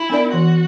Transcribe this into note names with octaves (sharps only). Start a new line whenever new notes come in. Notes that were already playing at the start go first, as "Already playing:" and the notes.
Already playing: E4
B3 D4 A#4 D5
E3 F#4